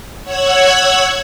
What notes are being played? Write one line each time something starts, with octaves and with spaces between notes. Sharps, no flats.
C#5 F#5 E6 F#6 G#6